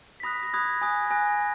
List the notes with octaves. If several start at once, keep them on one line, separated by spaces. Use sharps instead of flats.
B6
B5 D#6 F#6 A#6
B6
A#6
B5 D#6 F#6 G#6
G#5 D#6 F#6
G#5 D#6 F#6 A#6